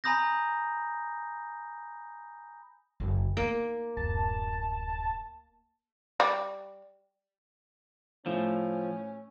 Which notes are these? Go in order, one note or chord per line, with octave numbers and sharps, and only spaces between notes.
G#5 A#5 B5 D#6 G6 A#6
F#1 F3
A#3 B3 D#4
D1 F#2 A5
G3
A2 F3 C#4